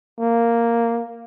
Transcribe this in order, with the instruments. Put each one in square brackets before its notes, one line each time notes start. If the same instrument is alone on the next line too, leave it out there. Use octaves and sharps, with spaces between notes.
[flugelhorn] A#3